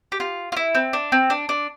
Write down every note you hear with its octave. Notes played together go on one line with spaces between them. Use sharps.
G4
F4
F4
E4
C4
D4
C4
D4
D4